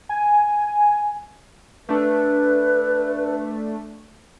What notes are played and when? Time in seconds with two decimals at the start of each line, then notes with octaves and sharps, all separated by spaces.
0.09 G#5
1.89 A3 D4 B4